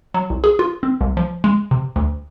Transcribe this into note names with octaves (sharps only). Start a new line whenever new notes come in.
F#3
C2
G#4
F4
C4
C2
F3
G#3
C3
D2